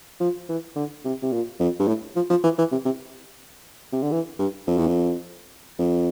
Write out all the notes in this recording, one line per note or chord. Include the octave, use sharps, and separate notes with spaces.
F3
E3
D3
C3
C3
A#2
F2
G2
A2
F3
F3
E3
E3
C3
C3
C3
D3
E3
G2
F2
E2
F2
F2